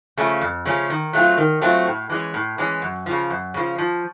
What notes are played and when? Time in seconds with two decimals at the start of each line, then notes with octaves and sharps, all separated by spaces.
0.17 C#3 F3 A3 C#4
0.41 F2
0.65 C#3 F3 A3 C#4
0.90 D#3
1.13 F#3 A3 C4 F4
1.38 D#3
1.61 F#3 A3 C4 F4
1.86 A2
2.09 E3 G#3 C#4
2.34 A2
2.58 E3 G#3 C#4
2.82 F#2
3.06 C#3 F3
3.30 F#2
3.54 C#3 F3
3.78 F3